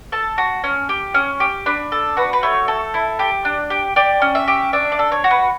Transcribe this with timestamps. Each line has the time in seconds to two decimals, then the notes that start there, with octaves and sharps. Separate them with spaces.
0.12 A4 A5
0.38 F#4
0.64 C#4
0.89 G4
1.14 C#4
1.40 G4
1.66 D4 B5
1.92 A4
2.17 F#4 B4
2.33 B4
2.43 A3 C#5
2.68 A4
2.94 E4
3.19 G4
3.45 D4
3.70 G4
3.96 G4 D5
4.22 C#4
4.35 E5
4.48 G4
4.73 D4 E5
4.92 D5
4.99 A4
5.12 C#5
5.24 F#4
5.31 B4